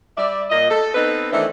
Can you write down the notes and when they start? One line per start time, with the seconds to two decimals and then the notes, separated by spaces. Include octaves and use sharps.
0.17 G3 D5 E5
0.50 A#2 D#5
0.70 A4
0.95 B3 C4 D#4 A4 B4
1.32 D#3 E3 A3 C4 D4 E4